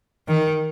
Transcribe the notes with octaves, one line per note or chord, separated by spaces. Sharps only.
D#3